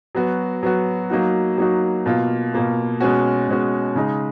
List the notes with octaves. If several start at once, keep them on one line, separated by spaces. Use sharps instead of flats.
F#3 B3 F#4
F#3 B3 F#4
F#3 A#3 D#4 F#4
F#3 A#3 D#4 F#4
B2 A#3 F4
B2 A#3 F4
B2 G#3 C#4 F#4
B2 G#3 C#4 F#4
C#3 G#3 D#4